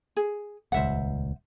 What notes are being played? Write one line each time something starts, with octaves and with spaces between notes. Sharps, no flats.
G#4
D#1 C#2 C5 E5 F#5